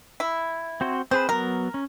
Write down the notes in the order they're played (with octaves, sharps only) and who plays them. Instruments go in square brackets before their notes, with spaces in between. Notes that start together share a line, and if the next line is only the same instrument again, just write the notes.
[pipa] E4
[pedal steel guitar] C4 F#4 C5
[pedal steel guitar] C4 G#4 B4 [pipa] C5
[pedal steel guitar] F#3 B3 [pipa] A#4
[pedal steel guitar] C#4